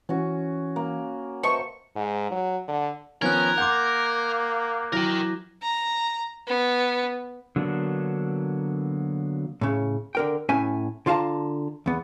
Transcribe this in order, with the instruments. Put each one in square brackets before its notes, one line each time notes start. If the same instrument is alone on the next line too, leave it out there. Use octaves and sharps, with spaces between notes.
[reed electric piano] E3 [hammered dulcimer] C#4 F#4
[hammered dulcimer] A#3
[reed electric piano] B4 D#5 A5 [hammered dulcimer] C5 E5 [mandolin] C#6
[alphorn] G#2
F#3
D3
[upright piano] D#3 F3 B3 [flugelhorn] C#4 [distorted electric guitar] A#4 [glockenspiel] F#6 G#6
[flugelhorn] A#3 [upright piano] F#5 C6 [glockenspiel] D6 G6
[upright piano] E3 F#3 [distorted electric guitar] A#4 G5 [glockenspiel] A#6
[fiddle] A#5
B3
[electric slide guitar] D3 F#3 A#3 B3 D4
[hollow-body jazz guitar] A2 C#3
D3 A#4 G5
A2 C#4 E5 G#5
D3 F4 F5 A5 A#5
E2 B3